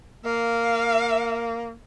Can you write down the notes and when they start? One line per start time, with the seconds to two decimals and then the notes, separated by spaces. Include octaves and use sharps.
0.25 A#3 F5